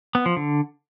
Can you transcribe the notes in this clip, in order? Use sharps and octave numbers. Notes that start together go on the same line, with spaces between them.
B3
F3
D3